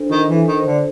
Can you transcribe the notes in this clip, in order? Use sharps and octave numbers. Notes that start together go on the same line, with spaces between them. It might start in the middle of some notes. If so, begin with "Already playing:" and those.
Already playing: D4 A4 C5
D#3 F4
E3
A4
D#3
C5
D3